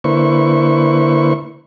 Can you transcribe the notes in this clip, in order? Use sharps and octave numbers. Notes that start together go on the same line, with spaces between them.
D3 A#3 E4 B4 C5 C#6